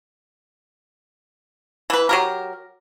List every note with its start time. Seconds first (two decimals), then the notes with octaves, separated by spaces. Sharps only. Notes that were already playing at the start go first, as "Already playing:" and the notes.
1.90 E3 B4
2.09 F#3 G4 A#4